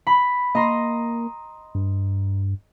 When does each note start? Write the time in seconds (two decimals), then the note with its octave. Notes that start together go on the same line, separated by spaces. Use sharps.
0.07 B5
0.55 A#3 D#5 A#5 C6
1.75 G2